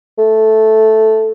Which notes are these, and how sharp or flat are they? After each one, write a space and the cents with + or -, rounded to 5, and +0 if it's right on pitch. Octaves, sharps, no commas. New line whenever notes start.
A3 -5